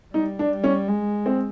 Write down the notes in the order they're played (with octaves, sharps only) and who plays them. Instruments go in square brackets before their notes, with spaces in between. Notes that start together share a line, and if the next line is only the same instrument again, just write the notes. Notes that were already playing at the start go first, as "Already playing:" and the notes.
[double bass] G3 [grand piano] D#4
[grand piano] D4
[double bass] G3
[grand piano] C#4
[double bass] G#3
[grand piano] C4